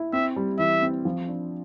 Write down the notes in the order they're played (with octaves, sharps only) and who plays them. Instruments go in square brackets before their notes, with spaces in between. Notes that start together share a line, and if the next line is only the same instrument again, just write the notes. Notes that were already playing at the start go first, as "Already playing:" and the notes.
Already playing: [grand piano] E4
[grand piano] C4 [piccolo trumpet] E5
[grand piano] G3
[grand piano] E3 [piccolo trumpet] E5
[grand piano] C4
F3
D4